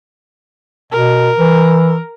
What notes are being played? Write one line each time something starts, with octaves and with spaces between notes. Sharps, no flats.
B2 A#4
E3